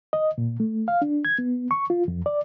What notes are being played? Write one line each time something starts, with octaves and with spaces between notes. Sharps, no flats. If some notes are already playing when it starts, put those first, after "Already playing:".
D#5
A#2
A3
F5
D4
G#6
B3
C#6
F4
F2
D5